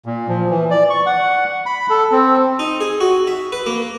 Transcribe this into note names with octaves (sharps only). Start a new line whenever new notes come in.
A#2
F3
E3
D5
C#6
F#5
B5
A4
C4
D#4
G#4
F#4
E5
B4
A#3